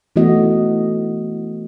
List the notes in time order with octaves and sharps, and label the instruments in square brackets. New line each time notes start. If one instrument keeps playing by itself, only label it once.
[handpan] E3 A3 B3 F#4 D#5